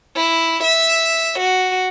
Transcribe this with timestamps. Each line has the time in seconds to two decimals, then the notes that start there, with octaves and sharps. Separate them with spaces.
0.15 E4
0.63 E5
1.39 F#4